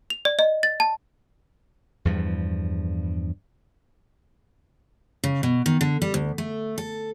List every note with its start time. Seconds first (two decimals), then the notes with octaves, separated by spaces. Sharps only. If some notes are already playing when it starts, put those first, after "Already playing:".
0.10 F7
0.25 D5
0.39 D#5
0.63 A6
0.80 A5
2.05 E2 G2 F3
5.24 C#3
5.43 B2
5.66 D#3
5.81 D3
6.02 G3
6.14 D2
6.38 A3
6.78 A4